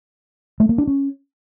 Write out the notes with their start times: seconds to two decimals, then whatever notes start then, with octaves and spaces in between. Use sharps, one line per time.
0.60 A3
0.69 A#3
0.78 D4
0.87 C#4